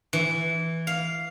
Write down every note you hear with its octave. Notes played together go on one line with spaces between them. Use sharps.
E3
F5